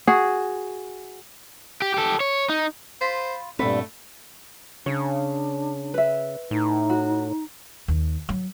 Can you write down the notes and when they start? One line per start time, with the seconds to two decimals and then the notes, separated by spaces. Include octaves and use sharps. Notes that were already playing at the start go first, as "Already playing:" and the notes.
0.07 F#4 G#4
1.82 G4
1.94 G4 A4
2.20 C#5
2.49 D#4
3.01 F4 C5 B5
3.59 G2 A#2 A3 B3 C4 A4 B4
4.86 C#3 D4 C#5
5.94 B4 E5
6.51 A2 D#4
6.90 F#4
7.88 D#2
8.29 F#3